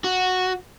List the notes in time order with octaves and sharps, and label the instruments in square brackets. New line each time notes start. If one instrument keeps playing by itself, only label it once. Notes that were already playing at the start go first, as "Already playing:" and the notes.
[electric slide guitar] F#4